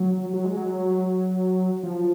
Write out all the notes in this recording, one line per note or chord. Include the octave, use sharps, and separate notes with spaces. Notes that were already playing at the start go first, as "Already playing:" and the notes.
Already playing: F#3
F#3
G#3
F#3
F3